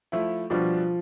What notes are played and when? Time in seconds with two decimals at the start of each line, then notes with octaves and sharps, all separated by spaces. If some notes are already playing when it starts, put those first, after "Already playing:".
0.12 F3 A3 E4
0.50 B2 F3 G3 D4